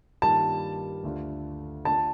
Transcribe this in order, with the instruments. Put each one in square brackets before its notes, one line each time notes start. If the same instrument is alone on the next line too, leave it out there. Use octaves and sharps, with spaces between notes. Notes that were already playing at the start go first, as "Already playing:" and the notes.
[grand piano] G2 D#3 G3 A#3 F4 [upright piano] A5
[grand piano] D2 D3 A3 D4 F4
[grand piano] D3 A3 D4 F4 [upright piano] A5